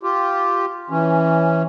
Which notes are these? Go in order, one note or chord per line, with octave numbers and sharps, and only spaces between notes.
F4 G4
E3 C#4